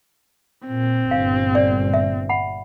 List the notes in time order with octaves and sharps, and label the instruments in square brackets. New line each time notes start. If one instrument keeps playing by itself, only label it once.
[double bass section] A#2 [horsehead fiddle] C4
[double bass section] G1 A#2 [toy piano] F5
[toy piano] D5
E5
F#5 B5